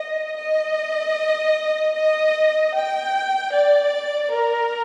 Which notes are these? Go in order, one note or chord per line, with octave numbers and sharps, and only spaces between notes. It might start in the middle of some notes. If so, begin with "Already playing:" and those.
Already playing: D#5
D#5
D#5
G5
D5
A#4